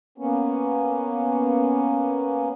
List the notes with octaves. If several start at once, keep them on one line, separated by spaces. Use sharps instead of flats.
A#3 B3 C#4